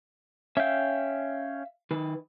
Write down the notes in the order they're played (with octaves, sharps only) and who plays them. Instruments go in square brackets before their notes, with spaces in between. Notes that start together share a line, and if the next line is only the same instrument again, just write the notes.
[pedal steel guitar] C#4 G5 [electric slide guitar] E5 F5
[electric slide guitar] D#3 B4